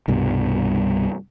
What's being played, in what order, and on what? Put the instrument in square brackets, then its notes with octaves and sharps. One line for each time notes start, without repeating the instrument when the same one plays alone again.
[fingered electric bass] C2 G2 B2